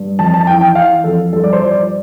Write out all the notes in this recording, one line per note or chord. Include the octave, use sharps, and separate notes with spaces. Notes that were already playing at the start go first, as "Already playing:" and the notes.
Already playing: G2
F2 A5
A5
E3 G5
G5
E3 F5
F2 A4
G2 A4
D5
C5
F3
D5